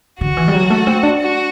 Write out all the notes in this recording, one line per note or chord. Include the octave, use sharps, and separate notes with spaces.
D3 F#4
E3
G3
F#3
A3
C4
D4
F#4